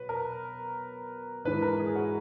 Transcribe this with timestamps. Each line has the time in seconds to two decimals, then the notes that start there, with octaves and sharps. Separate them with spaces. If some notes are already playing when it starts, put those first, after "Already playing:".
Already playing: B2 F#3 B4
0.09 A#4
1.45 G#2 E3 G#3 B4
1.62 A#4
1.80 G#4
1.95 F#4